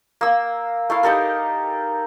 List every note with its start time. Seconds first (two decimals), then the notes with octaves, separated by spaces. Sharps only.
0.21 A#3 E6
0.90 A3 E4 F5
1.03 D#4 G4 A4 A#4